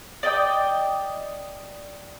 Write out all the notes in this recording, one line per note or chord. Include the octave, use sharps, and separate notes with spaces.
D5 D#5 G5 D6